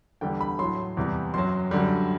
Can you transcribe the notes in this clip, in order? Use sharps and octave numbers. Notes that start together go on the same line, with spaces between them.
E2 D3 G3 G5
B5
A2 F#3 C6
E2 C3 G3
F#2 F#3 C6
F#2 D3 G3